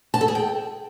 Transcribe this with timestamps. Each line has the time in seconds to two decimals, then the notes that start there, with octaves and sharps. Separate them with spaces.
0.14 A5
0.21 A4
0.28 G#4
0.35 G5